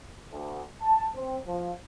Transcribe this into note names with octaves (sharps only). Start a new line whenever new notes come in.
D2
A5
C4
F3